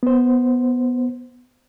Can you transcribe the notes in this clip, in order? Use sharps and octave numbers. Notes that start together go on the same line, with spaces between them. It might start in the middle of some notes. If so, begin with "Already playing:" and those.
B3 C5